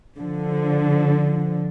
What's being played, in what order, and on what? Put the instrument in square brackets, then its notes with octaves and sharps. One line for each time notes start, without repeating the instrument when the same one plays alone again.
[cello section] D3 F3